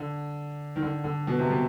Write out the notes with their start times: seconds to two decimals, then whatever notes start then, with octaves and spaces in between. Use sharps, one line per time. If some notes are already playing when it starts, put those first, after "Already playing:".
Already playing: D3
0.76 D#3
0.82 D3
1.04 D3
1.27 B2
1.39 C3
1.50 B2